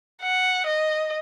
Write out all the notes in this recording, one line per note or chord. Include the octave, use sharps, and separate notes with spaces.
F#5
D#5